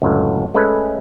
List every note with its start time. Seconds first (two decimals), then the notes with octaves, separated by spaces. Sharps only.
0.02 C#2 F#2 A2 D3
0.54 G#3 A3 C#4 A4 B4